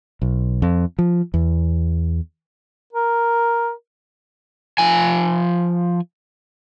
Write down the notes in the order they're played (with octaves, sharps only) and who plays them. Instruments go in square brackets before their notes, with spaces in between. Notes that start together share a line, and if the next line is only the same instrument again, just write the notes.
[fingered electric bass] B1
F2
F3
E2
[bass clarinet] A#4
[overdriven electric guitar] F3 G#5